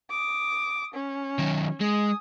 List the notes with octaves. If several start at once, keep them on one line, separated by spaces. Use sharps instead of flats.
D6 D#6
C#4
D#3 F#3
G#3 G#5 D#6